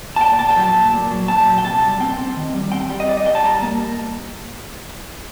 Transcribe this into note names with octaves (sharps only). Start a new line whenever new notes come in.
A5
A#2 G5
A#2 A5
G5
F#3
A5
A#2
A#2
F#3
A#2 A5
F#3
G5
C3 A5
G3
C4 G5
C4
D#3
G3
C4 G5
G3
D#5
G3 D5
D#5
G3 G5
A5
G3 A#5
A#3